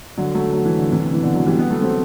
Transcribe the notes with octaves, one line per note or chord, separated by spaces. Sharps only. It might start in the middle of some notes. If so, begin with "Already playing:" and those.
D3 F#3
F#3 A3
F#3
E3
D3
C3 E3
E3
B2 D3
D3 F#3
E3 G3
G3 B3
F#3 A3
A3 C4